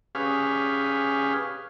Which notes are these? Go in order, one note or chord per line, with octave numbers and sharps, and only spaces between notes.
C#4 G4 G#4 B4 F5